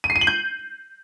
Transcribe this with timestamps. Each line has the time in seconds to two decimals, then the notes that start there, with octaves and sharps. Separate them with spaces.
0.04 D#7
0.10 C7
0.16 D#7
0.21 F#7
0.27 G6